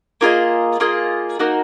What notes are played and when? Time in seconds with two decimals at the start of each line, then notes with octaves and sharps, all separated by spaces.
0.21 A#3 F4 G#4 D#5
0.80 A#3 F4 G#4 D#5
1.39 A#3 D#4 F#4